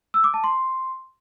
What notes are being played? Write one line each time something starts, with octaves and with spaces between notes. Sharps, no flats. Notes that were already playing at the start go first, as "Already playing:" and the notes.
E6
D6
A5
C6